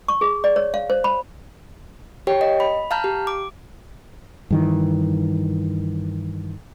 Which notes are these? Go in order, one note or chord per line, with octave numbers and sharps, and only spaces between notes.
C#6
G#4
D5
C#5
F5
C5
B5
G4 C#5 G5
D#5
B5
F5 A5 A#5 F6 G6
G4
D6
G2 D#3 E3